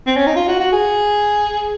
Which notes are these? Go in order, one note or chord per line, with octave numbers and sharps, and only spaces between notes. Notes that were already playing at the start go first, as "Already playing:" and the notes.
C4
C#4
D#4
F4
F#4
F#4
G#4